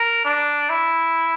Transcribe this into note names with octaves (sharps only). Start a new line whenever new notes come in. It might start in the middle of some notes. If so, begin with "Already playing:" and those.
Already playing: A#4
D4
E4